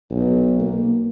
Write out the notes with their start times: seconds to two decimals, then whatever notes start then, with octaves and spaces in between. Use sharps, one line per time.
0.11 B1
0.60 A#3